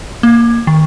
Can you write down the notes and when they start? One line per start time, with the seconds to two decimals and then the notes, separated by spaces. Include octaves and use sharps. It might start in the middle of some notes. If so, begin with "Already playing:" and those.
0.23 A#3
0.67 D#3